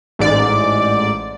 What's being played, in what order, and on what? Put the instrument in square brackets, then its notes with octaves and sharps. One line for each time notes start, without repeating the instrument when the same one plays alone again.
[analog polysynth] A1 G#2 D5